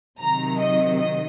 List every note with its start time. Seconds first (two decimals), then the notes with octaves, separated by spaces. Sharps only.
0.19 C3 D#3 F#3 A#5
0.59 D#5
0.98 D#5